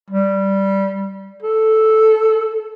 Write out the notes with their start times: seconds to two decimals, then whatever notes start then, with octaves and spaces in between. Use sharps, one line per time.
0.10 G3
1.42 A4